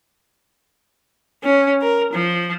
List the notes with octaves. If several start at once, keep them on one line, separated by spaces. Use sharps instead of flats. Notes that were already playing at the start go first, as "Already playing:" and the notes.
C#4
A#4
F3